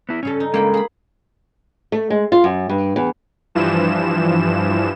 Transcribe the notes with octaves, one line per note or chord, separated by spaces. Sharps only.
B3 E4
G2 C#3 C#4 A4
D#4
G#3 A#3 C#4 G5 B5
G#4 B5
A3
G#3
F4
F#2
G2
E2
G2 E3 F3 E7